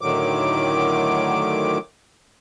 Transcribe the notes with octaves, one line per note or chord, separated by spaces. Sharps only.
A2 D3 D#3 F#3 D6